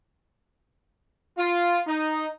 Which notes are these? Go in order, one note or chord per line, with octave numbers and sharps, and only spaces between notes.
F4
D#4